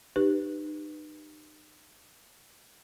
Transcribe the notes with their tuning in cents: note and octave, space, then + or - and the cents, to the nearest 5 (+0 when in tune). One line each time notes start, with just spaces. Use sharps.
D#4 -35 G4 +0 B4 +0